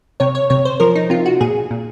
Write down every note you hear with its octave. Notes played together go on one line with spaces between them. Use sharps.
C3 C#5
C#5
C3 C#5
C5
F3 A#4
D#4
C3 F4
F#4
A#2 G#4
A#2